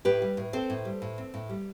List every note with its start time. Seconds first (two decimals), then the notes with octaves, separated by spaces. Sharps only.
0.05 A2 G4 B4
0.22 G3
0.37 A2
0.53 C4 A4 C5
0.70 A2
0.85 G3
1.02 A2
1.18 C4
1.34 A2
1.49 G3